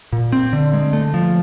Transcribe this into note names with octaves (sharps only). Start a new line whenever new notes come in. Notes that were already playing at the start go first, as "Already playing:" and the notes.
A#2
C4
D3
G#3
A3
F3